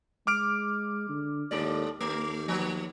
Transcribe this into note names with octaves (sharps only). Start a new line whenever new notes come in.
G#3 D6 F6 D7
D3
D#2 A2 G#3 D5
D#2 A3
F3 B3